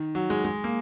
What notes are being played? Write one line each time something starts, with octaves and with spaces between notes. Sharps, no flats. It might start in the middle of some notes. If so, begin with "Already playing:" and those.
Already playing: D#3
F#3
G#3
G#3
A#3